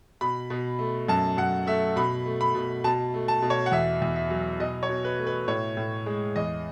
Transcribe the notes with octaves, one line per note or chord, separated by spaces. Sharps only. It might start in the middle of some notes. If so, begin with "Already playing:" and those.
B2 B5
B2
A3
F#2 A5
F#2 F#5
A3 E5
B2 B5
A3
B5
B2
B2 A5
A3
A5
B2
C#5
F#5
E2 E5
E2
E5
F#3
B2 D#5
C#5
B2
B4
A3
B4
A2 C#5
A2
G#3
E2 D#5